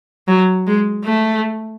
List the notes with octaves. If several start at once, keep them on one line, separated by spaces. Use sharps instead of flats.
F#3
G#3
A3